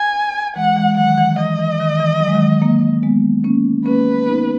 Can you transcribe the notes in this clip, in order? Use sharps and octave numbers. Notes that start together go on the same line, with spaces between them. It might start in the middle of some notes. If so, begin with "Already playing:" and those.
Already playing: G#5
E3 G#3 F#5
E3 G#3
D#3 F#3 F#5
E3
E3 D#5
E3
D#3
E3
F#3
G#3
D#3 F#3
F#3 A#3
G#3 B3
A#3 C#4
A#3 C#4 B4
B3 D#4